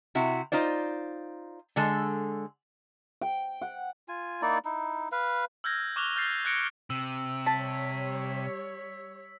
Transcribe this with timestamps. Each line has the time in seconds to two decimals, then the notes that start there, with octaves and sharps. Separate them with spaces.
0.15 C3 E4 F#4
0.52 D#4 F4 C5 D5
1.76 D3 G#3 A4
3.21 G5
3.62 F#5
4.08 F4 G#5
4.42 A#3 D#4 E4 D5
4.65 D#4 E4
5.12 B4 F5
5.64 E6 F6 G6 G#6 A#6
5.96 C#6 D6 F6 F#6 F7 G7
6.16 F6 G6 A6 C7
6.45 E6 F#6 G#6 A#6 C#7 D7
6.90 C3 E6
7.46 G3 C#5 A5 B6